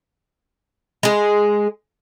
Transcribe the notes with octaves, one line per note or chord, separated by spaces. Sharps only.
G#3 G#4